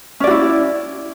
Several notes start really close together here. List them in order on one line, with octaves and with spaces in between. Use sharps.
C#4 D5 F#4 E4